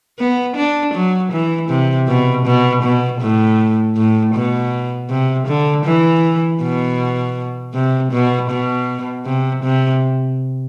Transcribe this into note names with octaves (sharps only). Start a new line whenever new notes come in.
B3
D4
F#3
E3
C3
B2
B2
B2
A2
A2
B2
C3
D3
E3
B2
C3
B2
B2
C3
C3